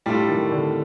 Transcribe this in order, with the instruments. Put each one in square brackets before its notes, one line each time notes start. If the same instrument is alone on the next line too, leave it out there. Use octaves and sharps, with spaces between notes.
[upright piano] A2 [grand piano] G3 D4 F4 A4
[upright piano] D#3
D3